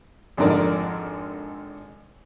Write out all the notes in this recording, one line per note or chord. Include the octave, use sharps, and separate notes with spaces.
G#1 F2 D3 A#4 D5